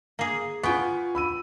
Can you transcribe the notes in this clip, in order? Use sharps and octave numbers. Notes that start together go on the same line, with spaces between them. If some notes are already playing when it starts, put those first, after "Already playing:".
A#3 G#4
B3 F4 G5 G#5 C#6
B5 E6 D#7